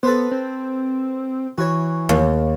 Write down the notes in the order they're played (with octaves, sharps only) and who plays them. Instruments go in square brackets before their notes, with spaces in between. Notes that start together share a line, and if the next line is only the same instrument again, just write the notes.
[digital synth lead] B3 [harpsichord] A4 B4 C5
[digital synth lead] C4
[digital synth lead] E3 [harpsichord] F#4 C#5
[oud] D#2